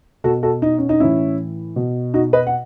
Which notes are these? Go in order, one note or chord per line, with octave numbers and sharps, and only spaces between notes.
B2 F#4 A4
F#4 A4
D#4
C#4
D#4
A2 E3 C#4 E4
B2
D#4 F#4
B4 D#5
F#5